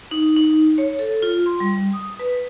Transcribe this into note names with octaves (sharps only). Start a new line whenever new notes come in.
D#4
D#4
C#5
A4
F4
C6
G3
D#6
B4